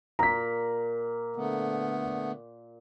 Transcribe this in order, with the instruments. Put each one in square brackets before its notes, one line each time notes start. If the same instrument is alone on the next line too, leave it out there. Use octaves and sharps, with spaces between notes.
[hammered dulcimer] A#2 [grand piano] A#5 B6
[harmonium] D3 A3 B3